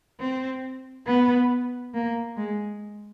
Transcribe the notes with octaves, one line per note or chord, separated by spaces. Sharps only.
C4
B3
A#3
G#3